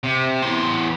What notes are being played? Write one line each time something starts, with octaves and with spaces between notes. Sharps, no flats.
C3
E2 C6